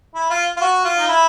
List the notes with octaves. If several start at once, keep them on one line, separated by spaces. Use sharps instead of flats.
E4
F4
F4
F#4
F4
D#4
E4